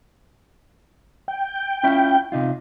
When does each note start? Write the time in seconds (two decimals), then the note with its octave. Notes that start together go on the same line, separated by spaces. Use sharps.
1.28 G5
1.83 C#4 E4 F4
2.32 C3 D#4 F4